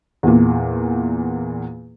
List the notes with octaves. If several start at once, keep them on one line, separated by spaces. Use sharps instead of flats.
E2 A#2